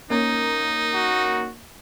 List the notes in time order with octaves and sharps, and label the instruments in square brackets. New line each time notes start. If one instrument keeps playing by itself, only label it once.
[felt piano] A#3 C#4 [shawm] D#4
[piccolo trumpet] F#4